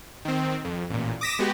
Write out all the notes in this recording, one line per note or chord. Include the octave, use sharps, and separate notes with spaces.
D#3 C4
F2
A1 A#2
D6 D#6 A#6 B6 E7
G#3 B3 F#4 G4